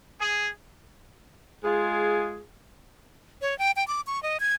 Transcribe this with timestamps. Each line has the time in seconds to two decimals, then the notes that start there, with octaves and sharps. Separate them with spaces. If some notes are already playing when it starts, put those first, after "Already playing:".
0.19 G#4
1.63 G#3 F4 G#4
3.42 C#5
3.59 G5
3.76 G5
3.88 D6
4.07 C#6
4.23 D#5
4.40 G#6